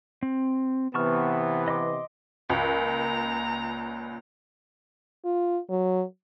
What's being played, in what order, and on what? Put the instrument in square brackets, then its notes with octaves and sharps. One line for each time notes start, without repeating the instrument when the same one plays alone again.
[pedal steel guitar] C4
[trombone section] C3 E3 B3 [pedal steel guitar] A5 C#6 F6
[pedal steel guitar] D#5 C6 D6
[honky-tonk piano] C#2 [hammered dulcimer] A#2 A#3 C#4 [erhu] A#5
[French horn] F4
F#3